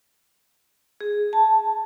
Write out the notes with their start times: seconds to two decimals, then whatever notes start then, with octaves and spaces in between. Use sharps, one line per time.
1.01 G#4
1.33 A5